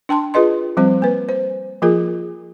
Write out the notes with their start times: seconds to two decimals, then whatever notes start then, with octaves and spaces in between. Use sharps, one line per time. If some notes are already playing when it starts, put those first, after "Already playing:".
0.09 D4 G5 A5 C6
0.34 F4 G#4 B4 D#5 C6
0.77 F3 G3 C4 C5
1.02 A#3 B4
1.29 C5
1.82 F3 A#3 F4 G#4 A#4